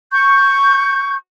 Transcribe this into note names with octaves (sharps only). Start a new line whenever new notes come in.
C#6 G6